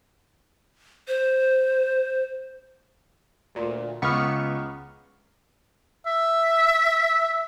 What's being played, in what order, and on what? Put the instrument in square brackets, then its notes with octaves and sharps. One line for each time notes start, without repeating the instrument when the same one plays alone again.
[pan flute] C5
[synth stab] D2 A#2
[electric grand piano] C#2 F6 [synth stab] B3 C#6
[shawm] E5